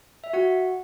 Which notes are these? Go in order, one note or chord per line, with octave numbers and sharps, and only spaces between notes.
E5
F#4 F#5